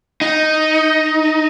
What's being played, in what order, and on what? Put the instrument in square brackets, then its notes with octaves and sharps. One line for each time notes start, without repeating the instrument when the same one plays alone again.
[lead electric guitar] D#4